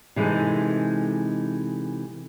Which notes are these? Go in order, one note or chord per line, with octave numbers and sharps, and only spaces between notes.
C3 E3 G#3 D#4 A4